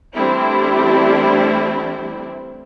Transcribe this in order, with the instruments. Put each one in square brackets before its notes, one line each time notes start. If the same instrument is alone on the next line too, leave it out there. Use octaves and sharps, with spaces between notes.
[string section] E3 G3 A3 C4 D4 E4